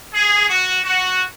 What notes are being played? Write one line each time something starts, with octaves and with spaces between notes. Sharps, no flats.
G#4
F#4
F#4